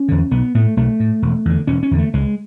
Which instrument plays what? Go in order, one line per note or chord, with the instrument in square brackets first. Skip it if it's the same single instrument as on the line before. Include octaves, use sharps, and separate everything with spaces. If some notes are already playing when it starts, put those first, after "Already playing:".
Already playing: [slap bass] C#4
E2 D3
B1 B3
A2 A3
B1 A3
A2
E1
E2 D3
E1 C#4
C#4
E2 D3
A3
C#2 G#3